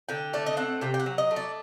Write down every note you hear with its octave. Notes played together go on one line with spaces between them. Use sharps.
D3 G5
A3 D5
D#5
C4 F#5
C3 G5
G5
F#5
F#3
D#5
A3
D5